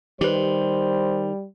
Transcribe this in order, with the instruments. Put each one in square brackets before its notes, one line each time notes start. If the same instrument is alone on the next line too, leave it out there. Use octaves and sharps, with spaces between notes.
[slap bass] D#3 [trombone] G3 [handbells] G4 B4 [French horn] C5